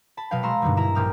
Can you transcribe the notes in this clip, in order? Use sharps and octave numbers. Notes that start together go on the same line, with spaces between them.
A5 B5
B2 F#3 B4 F5 G5
G#3 A#5 C6 C#6 E6 A#6
G2 B2 D3 D#3 G3
E4 A#5 E7
A#1 A#2 G4 D#6 F6